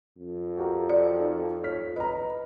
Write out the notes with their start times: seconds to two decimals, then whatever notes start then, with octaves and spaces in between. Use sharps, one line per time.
0.18 F2
0.57 F#4 G4 A#4
0.89 D5
1.20 D#4
1.63 C#5 F6 B6
1.96 B4 D#5 A#5